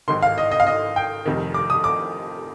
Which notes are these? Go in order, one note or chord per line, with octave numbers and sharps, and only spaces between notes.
G#1 G#2 D#3 C6
F5
D#5
D#5
F5
D#5
G5
F1 F2 C3 D#3
D6
D#6
D6